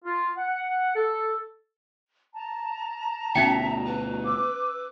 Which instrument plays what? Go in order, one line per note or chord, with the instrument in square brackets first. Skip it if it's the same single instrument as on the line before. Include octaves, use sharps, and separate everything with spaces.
[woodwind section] F4
F#5
A4
[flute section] A5 A#5
[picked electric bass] D2 B2 [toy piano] C#4 D#4 G5 [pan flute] E5
[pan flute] B4
[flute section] D6 E6